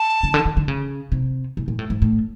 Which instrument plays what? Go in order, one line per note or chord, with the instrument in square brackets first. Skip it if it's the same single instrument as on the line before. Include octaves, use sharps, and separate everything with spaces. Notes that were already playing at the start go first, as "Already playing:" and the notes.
Already playing: [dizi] A5
[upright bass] C#3
D3
D#3
D3
C#3
C3
B2
A#2
A2
G#2
A2